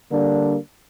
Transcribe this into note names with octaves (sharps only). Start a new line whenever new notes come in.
D3 G3 A#3 D4